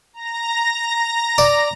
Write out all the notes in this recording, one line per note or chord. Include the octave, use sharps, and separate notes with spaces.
A#5 A#6
D5